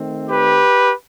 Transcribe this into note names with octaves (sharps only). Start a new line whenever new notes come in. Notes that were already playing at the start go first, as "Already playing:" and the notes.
Already playing: D#3 A3 C4
G4 B4